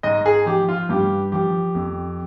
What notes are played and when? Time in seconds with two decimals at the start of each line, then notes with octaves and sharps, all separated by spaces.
0.03 G#2 D#5
0.26 G#4
0.46 F3 G4
0.69 F4
0.89 G2 G4
1.32 F3 G4
1.75 F2